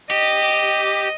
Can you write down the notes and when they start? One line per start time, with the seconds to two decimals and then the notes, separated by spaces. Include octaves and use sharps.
0.11 G4 D#5